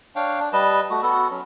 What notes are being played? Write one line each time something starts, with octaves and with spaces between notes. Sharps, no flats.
D4 C#5 F5 G5
D4
G3 B4 D#5 A5
A3 F#4
B3 F#4 A4
F#3 C#4